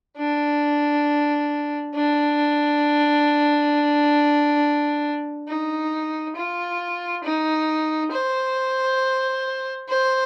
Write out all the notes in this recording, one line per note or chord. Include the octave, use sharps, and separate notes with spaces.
D4
D4
D#4
F4
D#4
C5
C5